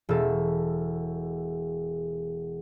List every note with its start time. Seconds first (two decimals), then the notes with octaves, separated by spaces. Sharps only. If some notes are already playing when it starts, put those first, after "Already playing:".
0.09 E1 A4